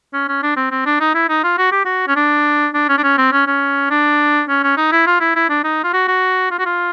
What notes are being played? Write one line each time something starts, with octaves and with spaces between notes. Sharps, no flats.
C#4
C#4
D4
C4
C4
D4
D#4
E4
D#4
F4
F#4
G4
F#4
C#4
D4
D4
C#4
D4
C#4
C4
C#4
C#4
D4
C#4
C#4
D#4
E4
F4
E4
E4
D4
D#4
F4
F#4
F#4
F4
F#4
F4